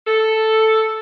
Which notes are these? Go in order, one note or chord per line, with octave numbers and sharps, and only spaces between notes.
A4